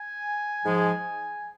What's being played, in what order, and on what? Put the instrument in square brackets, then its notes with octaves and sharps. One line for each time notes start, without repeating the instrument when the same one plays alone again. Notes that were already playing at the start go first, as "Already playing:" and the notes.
Already playing: [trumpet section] G#5
[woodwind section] G#2 F3 G#3